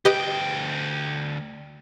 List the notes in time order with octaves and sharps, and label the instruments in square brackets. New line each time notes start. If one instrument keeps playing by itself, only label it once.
[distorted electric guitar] D2 G5 [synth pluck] G4 B4 D#5